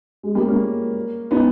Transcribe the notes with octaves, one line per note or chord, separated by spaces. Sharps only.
G#3
G3 A#3
A#3 C#4
B3 D#4